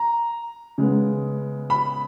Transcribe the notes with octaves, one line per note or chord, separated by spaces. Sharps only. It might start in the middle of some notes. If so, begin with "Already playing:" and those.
Already playing: A#5
C#3 G#3 B3
B5